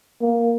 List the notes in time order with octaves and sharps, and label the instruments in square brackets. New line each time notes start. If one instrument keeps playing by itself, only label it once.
[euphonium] A#3